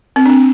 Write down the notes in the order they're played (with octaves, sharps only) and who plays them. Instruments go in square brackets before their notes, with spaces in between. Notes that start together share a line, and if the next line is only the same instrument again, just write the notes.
[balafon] C4
D4
C4